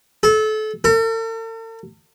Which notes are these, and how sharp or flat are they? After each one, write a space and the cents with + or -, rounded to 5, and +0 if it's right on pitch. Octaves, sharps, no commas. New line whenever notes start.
A4 -30
A4 +45